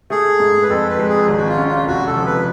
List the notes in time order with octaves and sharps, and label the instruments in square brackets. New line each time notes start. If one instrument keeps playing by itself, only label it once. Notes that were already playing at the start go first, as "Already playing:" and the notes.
[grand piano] A3 [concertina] G#4
[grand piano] G#2
[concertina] B4
[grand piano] F2 [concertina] A4
[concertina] B4
[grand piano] G#3
[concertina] G#4
[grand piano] G#1
[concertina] F#4
F4
[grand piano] C#4
[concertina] F4
[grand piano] F1 [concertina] F#4
[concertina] A4
[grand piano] F3
[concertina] B4